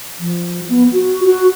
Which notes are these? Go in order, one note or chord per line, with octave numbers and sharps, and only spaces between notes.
F3
B3
F#4
F#4